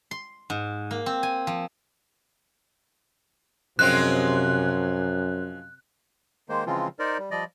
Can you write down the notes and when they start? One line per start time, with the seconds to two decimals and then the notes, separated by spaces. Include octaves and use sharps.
0.11 C6
0.50 G#2
0.91 A#3
1.06 C4
1.23 G#5
1.47 F3
3.79 F#2 C3 F3 G#3 C4 F#6
6.49 D#3 G#3 A#3 C5
6.66 C#3 E3 F3 G#3 C4 F4
6.99 D#4 A#4 C5 D5
7.18 G3
7.31 F3 G3 D5 D#5